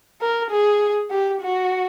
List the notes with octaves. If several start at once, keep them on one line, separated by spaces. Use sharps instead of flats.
A#4
G#4
G4
F#4